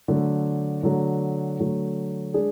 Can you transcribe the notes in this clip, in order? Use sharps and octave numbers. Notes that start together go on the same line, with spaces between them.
D3 F#3 A3
D3 F#3 A3
D3 F#3 A3
G#3 D4 G#4